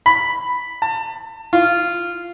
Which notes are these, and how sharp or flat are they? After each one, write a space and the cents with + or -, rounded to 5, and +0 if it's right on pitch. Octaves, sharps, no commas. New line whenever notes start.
B5 +0
A5 +30
F4 -10